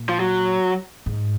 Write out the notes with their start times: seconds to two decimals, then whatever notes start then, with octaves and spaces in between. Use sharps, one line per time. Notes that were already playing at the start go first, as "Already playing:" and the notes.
Already playing: A#2
0.09 F3
0.20 F#3
1.06 G#2